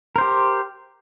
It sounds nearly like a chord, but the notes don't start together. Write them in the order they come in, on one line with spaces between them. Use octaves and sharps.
A#4 C5 G4